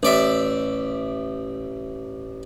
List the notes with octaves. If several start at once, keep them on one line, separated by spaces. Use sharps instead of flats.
A1 D5 E5